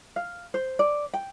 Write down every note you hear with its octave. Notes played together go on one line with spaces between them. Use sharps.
F5
C5
D5
G5